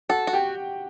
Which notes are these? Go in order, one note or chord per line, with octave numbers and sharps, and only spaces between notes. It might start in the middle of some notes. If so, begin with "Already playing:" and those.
F#4 A4 F#5
F#4
G4 G5